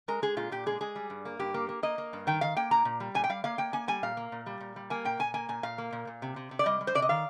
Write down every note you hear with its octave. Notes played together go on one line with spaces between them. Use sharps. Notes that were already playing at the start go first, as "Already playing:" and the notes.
G#3 A#4
G#3 G#4
A#2 F4
A#2 G4
G#3 G#4
G#3 G#4
G3
G2
A#3
G2 G4
A#3
A#3
A#3 D#5
A#3
G2
D#3 G5
D#3 F5
A#3 G5
A#2 A#5
A#2
G3
A#2 G#5
G5
G3 F5
A#3 F5
A#3 G5
A#3 G#5
G3 G#5
A#2 F5
A#3
A#2
G3
A#2
G3
A#3 G#5
A#2 G5
A#2 G#5
A#3 G#5
A#2 G#5
A#2 F5
A#3
A#2
A#2
C3
C3
C3
D5
G3 D#5
G3
C5
C3 D5
D#5
D#3 F5